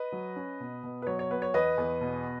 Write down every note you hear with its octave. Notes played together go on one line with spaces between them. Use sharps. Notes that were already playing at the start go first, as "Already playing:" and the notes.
Already playing: B4 D#5
F#3
C#4
B2
B2
B4
F#3 C#5
C#5
B3 B4
C#5
E2 B4 D#5
E2
B2